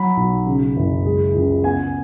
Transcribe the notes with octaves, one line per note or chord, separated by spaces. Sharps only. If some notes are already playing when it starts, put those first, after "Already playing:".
Already playing: F#3 B5
B1
C#3
F#1
G#3
C#2
B3 G#5